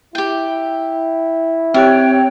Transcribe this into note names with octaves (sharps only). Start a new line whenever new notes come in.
E4 G4 G5
C4 G4 C#5 E5 G5 F#6